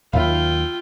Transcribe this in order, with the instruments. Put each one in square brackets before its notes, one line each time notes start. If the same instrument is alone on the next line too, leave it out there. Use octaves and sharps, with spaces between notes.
[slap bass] D#2 D#3 F#3 [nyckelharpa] F4 G5 [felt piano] E5 F5 B5